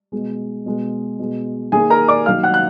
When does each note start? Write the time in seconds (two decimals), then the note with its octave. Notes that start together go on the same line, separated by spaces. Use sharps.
0.12 B2 G#3
0.66 B2 G#3
1.19 B2 G#3
1.72 D#3 A#3 G#4 G#5
1.90 A#4 A#5
2.08 D5 D6
2.26 D#3 F#3 A#3 F5 F6
2.43 F#5 F#6
2.54 F#6